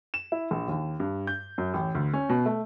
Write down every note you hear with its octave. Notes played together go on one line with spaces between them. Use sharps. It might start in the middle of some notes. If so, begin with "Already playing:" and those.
E7
E4
A#1
D#2
G2
G6
F#2
A1
D2
C#4
B2
A3